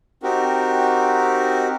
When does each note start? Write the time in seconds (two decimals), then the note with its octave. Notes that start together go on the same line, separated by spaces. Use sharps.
0.23 C4 D#4 F#4 G4 A#4